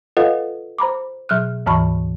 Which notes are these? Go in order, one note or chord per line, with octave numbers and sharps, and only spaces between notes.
F4 A4 B4 D#5 F5 F#5
C5 A#5 B5 D6
B2 F#3 F6 F#6
D2 G#2 E3 A5 B5 C#6